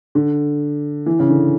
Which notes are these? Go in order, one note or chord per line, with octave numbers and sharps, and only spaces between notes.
D3
E3
C#3
D3